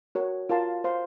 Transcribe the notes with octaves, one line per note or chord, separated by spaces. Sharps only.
F#4 A#4 C#5
F4 A#4 F5 A5 C6
C5 F5 C6